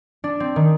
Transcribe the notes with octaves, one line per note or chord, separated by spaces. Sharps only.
D4
C4
D#3